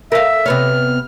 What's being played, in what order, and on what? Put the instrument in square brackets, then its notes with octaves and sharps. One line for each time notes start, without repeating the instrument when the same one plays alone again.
[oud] A#4 F5 [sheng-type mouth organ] E5
[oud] C3 B3 C#5 [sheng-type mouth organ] F6